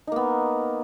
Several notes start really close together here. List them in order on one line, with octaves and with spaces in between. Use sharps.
D#4 A#3 B3